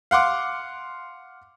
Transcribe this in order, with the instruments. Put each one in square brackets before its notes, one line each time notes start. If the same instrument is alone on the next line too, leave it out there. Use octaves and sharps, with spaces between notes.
[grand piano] F5 F#5 C6 D6